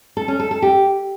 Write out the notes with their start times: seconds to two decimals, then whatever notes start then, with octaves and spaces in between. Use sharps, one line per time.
0.17 A4
0.28 C#4
0.40 A4
0.51 A4
0.62 G4